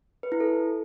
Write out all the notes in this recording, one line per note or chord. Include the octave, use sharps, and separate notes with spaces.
B4
E4
A4